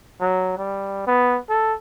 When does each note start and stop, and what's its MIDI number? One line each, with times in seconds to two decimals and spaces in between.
0.20 0.54 54
0.58 1.05 55
1.07 1.39 59
1.49 1.74 69